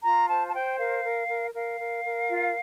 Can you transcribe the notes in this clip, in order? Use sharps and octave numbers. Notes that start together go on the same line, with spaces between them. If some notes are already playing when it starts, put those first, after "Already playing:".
F4 A#5
C5 A5
A5
C5 G5
A#4 F5
A#4
A#4
A#4 F5
A#4
A#4
F4